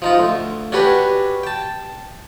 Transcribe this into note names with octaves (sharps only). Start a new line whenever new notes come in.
F3 D#4 F4
D2
C#4 D4 F#4 G4 B4
G5 A5